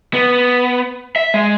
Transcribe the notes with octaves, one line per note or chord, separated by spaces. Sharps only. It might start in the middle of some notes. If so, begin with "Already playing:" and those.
B3
E5
G#3